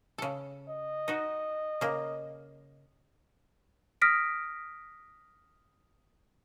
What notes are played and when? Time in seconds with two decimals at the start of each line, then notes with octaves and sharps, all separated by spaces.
0.18 C#3 A4
0.69 D#5
1.08 D#4 F#4
1.81 C#3 A#3
4.02 D#6 F6 A#6 B6 D7